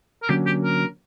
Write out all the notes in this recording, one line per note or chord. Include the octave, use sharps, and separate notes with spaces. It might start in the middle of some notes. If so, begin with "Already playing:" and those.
A#4
D3 F#3 A#3 C#4 G4
G4
A#4